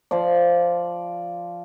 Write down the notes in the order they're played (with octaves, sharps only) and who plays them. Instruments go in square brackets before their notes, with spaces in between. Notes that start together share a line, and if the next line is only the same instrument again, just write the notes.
[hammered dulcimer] F3 D5